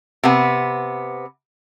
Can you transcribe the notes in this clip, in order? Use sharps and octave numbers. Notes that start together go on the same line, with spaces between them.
C3 B3